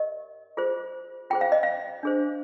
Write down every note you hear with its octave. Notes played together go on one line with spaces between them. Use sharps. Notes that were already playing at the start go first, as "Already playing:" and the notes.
Already playing: G4 A#4 D#5
F4 G#4 C5
F4 G#4 C5 G5
F5
D#5
F5
D4 G#4 C5